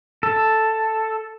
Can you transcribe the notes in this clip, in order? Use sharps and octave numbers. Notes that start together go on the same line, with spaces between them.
A4